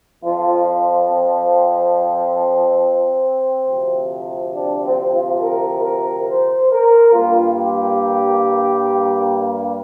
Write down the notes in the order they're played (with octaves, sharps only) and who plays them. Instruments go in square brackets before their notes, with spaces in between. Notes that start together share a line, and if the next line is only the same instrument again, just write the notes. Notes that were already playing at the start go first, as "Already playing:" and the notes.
[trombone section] F2 F3 C4 F4
C4
D2 C3 F3
D4
C4
F4
A#4
A#4
C5
A#4
G2 G3 A#3 F4
G4